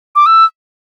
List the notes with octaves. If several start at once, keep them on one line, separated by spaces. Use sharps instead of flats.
D6
E6